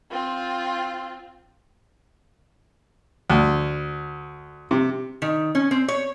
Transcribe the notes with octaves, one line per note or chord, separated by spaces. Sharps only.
C4 F4
D2
C3
D#3
C#4
C4
C#5